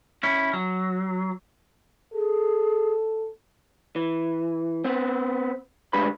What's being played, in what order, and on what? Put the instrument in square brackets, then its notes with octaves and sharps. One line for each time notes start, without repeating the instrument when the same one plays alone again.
[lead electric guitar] C#4 E4
F#3
[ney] G#4 [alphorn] A4
[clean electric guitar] E3
B3 C4
D2 G#3 D4 G4 B4 B5